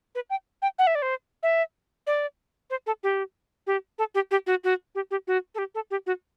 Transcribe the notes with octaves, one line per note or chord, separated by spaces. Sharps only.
B4
G5
G5
F#5
E5
D5
C5
E5
D5
C5
A4
G4
G4
A4
G4
G4
F#4
F#4
G4
G4
F#4
A4
G4
A4
G4
F#4